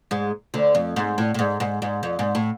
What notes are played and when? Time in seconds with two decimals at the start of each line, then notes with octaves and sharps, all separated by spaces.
0.11 G#2 G#3
0.54 D2 D3
0.75 F2
0.96 G#2
1.18 A2
1.34 A2
1.39 G#2
1.60 G#2
1.82 G#2
2.03 F2
2.19 G#2
2.35 A2